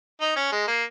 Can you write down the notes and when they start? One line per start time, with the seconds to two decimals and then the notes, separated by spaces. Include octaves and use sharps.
0.21 D#4
0.36 C#4
0.52 G#3
0.67 A#3